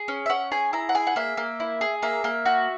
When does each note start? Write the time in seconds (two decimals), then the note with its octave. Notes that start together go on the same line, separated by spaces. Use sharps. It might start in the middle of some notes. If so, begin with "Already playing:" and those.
Already playing: G#4
0.08 C#4
0.26 E5
0.30 C#4 F#5
0.52 G#4 G#5
0.73 E4 A#5
0.89 F#5
0.95 G#4 G#5
1.07 F#5
1.16 A#3 E5
1.37 A#3
1.60 E4
1.81 G#4
2.02 A#3 E5
2.24 A#3
2.46 F#4